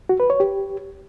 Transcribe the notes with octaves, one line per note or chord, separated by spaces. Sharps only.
F#4
B4
C#5
G4